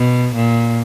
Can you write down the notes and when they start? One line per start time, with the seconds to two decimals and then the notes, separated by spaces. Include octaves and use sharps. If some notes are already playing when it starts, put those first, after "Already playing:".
Already playing: B2
0.35 A#2